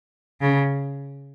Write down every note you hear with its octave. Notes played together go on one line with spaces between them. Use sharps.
C#3